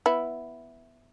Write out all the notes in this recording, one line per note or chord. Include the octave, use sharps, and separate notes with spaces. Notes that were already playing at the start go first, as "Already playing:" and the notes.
B3 E4